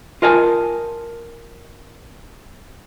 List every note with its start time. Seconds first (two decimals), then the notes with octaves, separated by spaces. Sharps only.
0.22 F4 A#4 D#5 G#5 A5